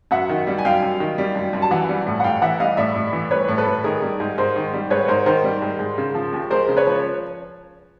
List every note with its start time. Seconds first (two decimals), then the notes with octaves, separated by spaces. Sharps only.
0.11 F#2 E5 F#5
0.29 D#3
0.47 G3
0.58 G#5
0.65 F#2 F5 G5
0.83 F#2
1.00 D#3
1.18 G3
1.35 F#2
1.53 F#2
1.62 A5
1.71 E3 F#5 G#5
1.89 G3
2.07 A2
2.20 F#5
2.24 A2 F5 G5
2.42 E3 E5 F#5
2.60 G3 D#5 F5
2.77 A2 D5 E5
2.96 A2
3.13 E3
3.31 G3 B4 C#5
3.48 A2
3.58 A4 B4
3.66 A2
3.84 D#3 G#4 A#4
4.02 G3
4.20 G#2
4.38 G#2 A#4 C5
4.56 D#3
4.73 G3
4.90 G#2 B4 C#5
5.08 G#2 A#4 C5
5.26 D#3 A#4 C5
5.44 G3
5.62 G#2
5.79 G#2
5.98 C#3
6.14 F3
6.32 D#2
6.50 G#3 A#4 C5
6.69 C#3
6.77 B4 C#5
6.86 F3